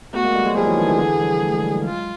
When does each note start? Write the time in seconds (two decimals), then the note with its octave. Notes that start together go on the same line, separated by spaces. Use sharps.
0.13 A3 B3 F#4
0.24 G#3 A#3
0.35 G3 A3
0.45 F#3 G#3
0.56 F3 G3 G#4
0.67 E3 F#3
0.78 D#3 F3
0.88 D3 E3
0.99 D3 E3
1.20 F3 G3
1.42 A3
1.53 G#3
1.63 G3
1.73 F#3 G#3
1.84 F4